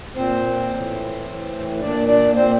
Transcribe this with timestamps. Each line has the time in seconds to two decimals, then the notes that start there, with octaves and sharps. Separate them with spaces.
0.16 A#2 C4 C5
0.71 A2 E3
1.26 A2 E3
1.80 A#2 D4 D5
2.07 D4 D5
2.35 A#2 C4 C5